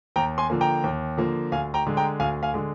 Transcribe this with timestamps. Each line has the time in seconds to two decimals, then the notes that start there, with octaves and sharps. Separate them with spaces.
0.16 D#2 G5 A#5
0.38 G#5 C6
0.50 D3 F3 A#3
0.61 G5 A#5
0.84 D#2
1.17 D3 F3 A#3
1.52 D2 F5 G#5
1.74 G5 A#5
1.87 D3 G#3
1.97 G5 A#5
2.20 D2 F5 G#5
2.43 F5 G#5
2.54 D3 G#3